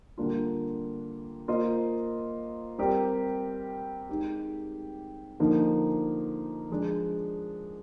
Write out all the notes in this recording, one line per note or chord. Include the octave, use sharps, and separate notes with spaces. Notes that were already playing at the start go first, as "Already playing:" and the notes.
D3 G3 A#3 D4 F4
A#3 F4 C5 D#5
G3 C4 G4 A#4 D5
G#3 D#4 G4
D3 F3 A#3 D#4
F3 G#3 D4